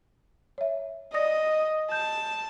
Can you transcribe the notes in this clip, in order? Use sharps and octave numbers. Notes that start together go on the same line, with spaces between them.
C#5 E5
D5 D#5 D#6 A#6
A5 G6